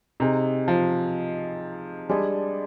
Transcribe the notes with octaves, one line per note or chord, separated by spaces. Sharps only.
C3 D#4 G#4 D#5
F3
G3 G#3 D4 G#4 D5